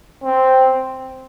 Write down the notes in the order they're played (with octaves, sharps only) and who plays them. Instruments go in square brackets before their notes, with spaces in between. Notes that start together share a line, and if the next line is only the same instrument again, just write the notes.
[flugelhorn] C4